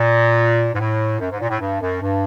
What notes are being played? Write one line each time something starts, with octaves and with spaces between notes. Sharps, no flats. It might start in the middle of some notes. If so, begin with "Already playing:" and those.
Already playing: A#2
G#2
A2
F#2
G#2
A#2
A2
G2
F#2
G2